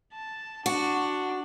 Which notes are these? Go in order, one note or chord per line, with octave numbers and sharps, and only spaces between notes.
A5
D4 F#4